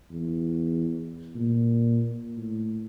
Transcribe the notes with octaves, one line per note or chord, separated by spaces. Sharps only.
E2
A#2
A2